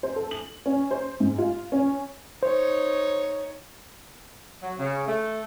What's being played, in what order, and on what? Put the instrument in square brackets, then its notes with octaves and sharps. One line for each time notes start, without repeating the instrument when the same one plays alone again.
[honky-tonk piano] C5
A4
F#7
C#4
C5
G#2
F4
C#4
[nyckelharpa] D#4 C#5 [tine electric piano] C5
[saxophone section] F#3
C#3
A3